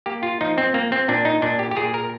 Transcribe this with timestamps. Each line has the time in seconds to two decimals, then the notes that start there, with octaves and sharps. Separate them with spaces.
0.06 A#3 G4
0.23 F4
0.41 F3 D#4
0.58 C4
0.74 A#3
0.92 C4
1.08 A#2 D4
1.25 D#4
1.42 A#2 D4
1.59 G4
1.71 G4
1.77 A#2 G#4
1.94 A#4